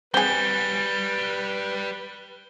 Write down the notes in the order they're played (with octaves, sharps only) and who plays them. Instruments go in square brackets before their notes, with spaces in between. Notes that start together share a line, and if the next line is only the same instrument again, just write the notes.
[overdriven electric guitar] G3 F#4 [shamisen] C4 G#4 [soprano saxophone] B4 [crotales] G7